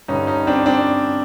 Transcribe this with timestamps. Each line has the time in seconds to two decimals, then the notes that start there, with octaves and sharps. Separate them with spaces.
0.08 G2 D3 G3 C#4 D#4
0.27 C#4 D#4
0.47 C4 D4
0.66 C4 D4